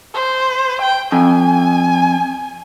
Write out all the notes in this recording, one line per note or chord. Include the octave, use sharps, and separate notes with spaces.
C5
G5
F2 G#5